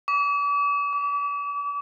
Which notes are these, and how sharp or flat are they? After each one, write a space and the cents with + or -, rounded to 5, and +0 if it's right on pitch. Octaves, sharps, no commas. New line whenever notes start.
D6 -40
D6 -25